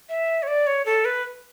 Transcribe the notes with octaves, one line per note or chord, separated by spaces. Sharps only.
E5
C#5
D5
C#5
A4
B4